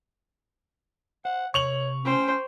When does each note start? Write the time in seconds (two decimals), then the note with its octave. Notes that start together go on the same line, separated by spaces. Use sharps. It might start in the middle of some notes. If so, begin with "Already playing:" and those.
1.25 C5 F#5
1.54 C3 C#5 C#6 F7 F#7
2.05 C#4 C5 G5